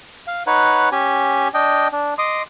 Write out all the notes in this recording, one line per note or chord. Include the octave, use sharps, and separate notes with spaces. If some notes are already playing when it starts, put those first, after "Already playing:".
F5
D#4 B4 C#5 F#5
C#4 G4 G#5
D4 D#5 G5
D4
D#5 C6 D6 D#6